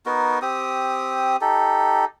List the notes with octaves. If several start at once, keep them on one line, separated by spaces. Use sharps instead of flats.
B3 D#4 F#4 A#4
C4 G4 D#6
D#4 G4 A4